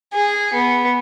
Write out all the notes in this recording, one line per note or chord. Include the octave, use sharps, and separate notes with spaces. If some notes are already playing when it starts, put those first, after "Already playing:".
G#4
B3